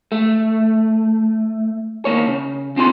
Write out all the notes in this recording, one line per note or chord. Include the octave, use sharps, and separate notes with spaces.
A3
D#2 B2 A#3 C#5
C#3
D#2 C4 F4 C6